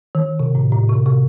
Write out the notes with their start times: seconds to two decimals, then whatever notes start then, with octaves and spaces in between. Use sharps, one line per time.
0.15 D#3
0.40 C3
0.55 A2
0.72 A2
0.89 C3
1.06 C3